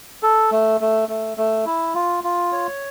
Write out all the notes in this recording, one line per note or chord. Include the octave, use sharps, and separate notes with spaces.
A4
A3
A3
A3
A3
E4
F4
F4
C#5